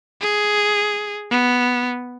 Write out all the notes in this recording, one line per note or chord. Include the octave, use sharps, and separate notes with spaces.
G#4
B3